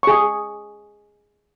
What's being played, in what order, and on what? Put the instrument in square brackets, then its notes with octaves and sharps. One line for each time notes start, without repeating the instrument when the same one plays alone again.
[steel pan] G#4 C#6